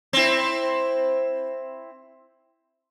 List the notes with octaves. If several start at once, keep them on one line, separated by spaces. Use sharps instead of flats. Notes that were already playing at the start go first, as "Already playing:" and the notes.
C4 E4